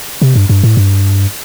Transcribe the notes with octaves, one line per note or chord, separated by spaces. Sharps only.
C3
G2
G2
A2
G2